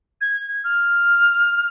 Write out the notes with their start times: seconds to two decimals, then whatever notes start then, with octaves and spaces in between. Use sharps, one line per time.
0.21 G#6
0.64 F6